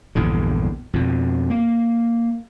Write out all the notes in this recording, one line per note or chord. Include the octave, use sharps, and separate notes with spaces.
A#1 E2 G2 D3
F2 B2
A#3